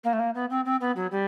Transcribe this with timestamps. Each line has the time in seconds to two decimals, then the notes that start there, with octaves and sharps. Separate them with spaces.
0.04 A#3
0.13 A3
0.19 A#3
0.35 B3
0.50 C4
0.65 C4
0.81 B3
0.96 F#3
1.11 G3